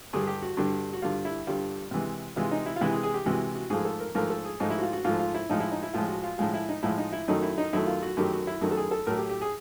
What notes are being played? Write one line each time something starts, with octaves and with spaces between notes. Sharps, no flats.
G2 D3 G3 G#4
G4
F#4
G2 D3 G3
F#4
G2 D3 G3 F4
E4
G2 D3 G3 F4
C3 E3 G#3
C3 E3 G#3 F4
D#4
E4
F4
C3 E3 G#3 E4
G#4
G#4
G4
C3 E3 G#3 F#4
F#4
G#2 F3 A3 G#4
A4
A#4
G#2 F3 A3 A#4
A4
G#4
G#2 F3 A3 D#4
E4
F#4
F4
F#4
G#2 F3 A3 F4
F4
E4
A2 F3 G#3 D#4
E4
D#4
E4
A2 F3 G#3 F4
F#4
F4
A2 F3 G#3 F4
E4
D#4
A2 F3 G#3 E4
D#4
E4
F#2 D#3 F#3 A3 D#4
E4
D#4
F#2 D#3 F#3 A3 E4
F4
F#4
F#2 D#3 F#3 A3 G4
F#4
E4
F#2 D#3 F#3 A3 F#4
A4
G#4
A4
A2 F#3 A3 A#4
G4
G4
G#4